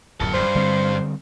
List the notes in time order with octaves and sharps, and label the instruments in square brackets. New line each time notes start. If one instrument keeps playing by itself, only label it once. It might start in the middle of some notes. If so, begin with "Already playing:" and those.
[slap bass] D1 F#2 [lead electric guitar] A#4 A5
[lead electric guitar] G2 [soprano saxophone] C5
[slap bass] D3 G3 C4